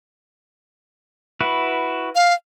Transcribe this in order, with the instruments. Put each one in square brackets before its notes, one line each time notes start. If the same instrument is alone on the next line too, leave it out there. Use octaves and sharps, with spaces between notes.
[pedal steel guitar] E4 F#4 B4
[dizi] F5